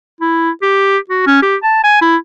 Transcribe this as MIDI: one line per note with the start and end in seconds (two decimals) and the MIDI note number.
0.21 0.50 64
0.62 0.98 67
1.10 1.24 66
1.27 1.42 61
1.42 1.56 67
1.63 1.83 81
1.84 1.97 80
2.02 2.16 64